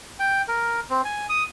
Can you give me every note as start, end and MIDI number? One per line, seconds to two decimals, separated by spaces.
0.20 0.42 79
0.48 0.80 70
0.90 1.02 60
1.05 1.26 80
1.29 1.43 87